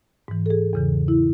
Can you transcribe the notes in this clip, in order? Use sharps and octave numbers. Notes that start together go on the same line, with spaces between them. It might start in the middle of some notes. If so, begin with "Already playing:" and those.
G#2 E3
A4
G#4
E2 C#3 E3
E4